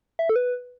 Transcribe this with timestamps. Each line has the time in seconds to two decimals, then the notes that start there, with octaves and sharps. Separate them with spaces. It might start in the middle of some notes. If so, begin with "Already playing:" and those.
0.19 E5
0.29 A4
0.36 B4